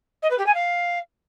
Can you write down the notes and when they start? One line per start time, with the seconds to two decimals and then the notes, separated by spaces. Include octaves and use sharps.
0.22 D#5
0.30 B4
0.38 G4
0.46 G#5
0.54 F5